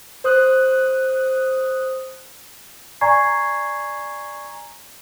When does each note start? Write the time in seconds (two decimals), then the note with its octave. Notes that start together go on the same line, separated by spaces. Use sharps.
0.24 C5 D#6 F#6
3.01 D5 G#5 A#5 C#6 G#6 C7